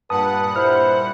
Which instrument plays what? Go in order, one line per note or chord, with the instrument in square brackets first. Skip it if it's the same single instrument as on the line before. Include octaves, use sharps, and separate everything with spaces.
[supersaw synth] G2 A#2 F#5 [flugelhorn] B4 [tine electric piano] A5 D#6
[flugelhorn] E4 [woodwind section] C5 [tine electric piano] B5 F6